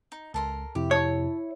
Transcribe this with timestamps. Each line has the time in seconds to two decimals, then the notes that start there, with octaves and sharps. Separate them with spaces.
0.12 D#4
0.34 C#2 A4 A#4 C6
0.75 F2 C3 E4 G4
0.91 A4 C#5